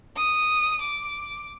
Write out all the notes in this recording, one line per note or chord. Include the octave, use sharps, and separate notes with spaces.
D#6
D6